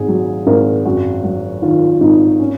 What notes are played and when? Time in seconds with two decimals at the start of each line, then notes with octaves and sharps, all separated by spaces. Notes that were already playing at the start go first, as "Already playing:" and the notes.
Already playing: G#1 G#2 G#4
0.08 F#3
0.47 G#1 A#4
0.85 F#2 F#4
1.24 F#3
1.62 D#3 F4
2.01 G#1 D#4
2.40 C#4